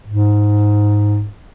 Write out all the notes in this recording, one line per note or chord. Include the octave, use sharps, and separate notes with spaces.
G#2